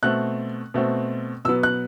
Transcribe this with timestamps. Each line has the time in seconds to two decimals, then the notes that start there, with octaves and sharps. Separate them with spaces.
0.03 B2 A3 C4 F#6
0.74 B2 A3 C4
1.45 B2 F#3 B3 E6
1.63 F#6